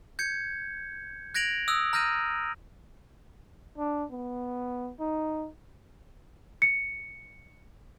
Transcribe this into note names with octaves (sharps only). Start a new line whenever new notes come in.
G6 G#6 C#7
F#6 G#6 A#6 D7 F7 F#7
D#6 E6 F#6
A#5 F6 G6 A#6 D#7
D4
B3
D#4
C#7